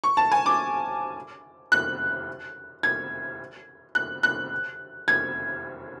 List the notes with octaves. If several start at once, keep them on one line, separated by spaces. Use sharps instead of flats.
C#6
A5
G#5
D6
F#6
G#6
F#6
F#6
G#6